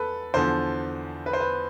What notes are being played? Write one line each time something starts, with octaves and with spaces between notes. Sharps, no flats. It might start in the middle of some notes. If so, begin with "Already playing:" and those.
Already playing: E2 A4 B4
E2 D3 F3 C5
B4
C5
B4